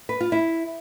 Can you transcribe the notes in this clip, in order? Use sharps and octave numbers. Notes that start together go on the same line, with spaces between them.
B4
F4
E4